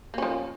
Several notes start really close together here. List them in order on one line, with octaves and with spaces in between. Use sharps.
A#3 C#4 F3